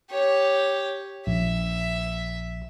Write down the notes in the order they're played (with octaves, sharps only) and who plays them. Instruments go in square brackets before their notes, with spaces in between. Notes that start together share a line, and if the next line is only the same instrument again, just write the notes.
[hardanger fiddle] G4 C#5
[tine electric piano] A#1 [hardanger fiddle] E5